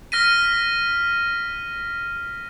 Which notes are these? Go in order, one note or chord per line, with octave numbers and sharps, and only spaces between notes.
F6 A#6 B6 D#7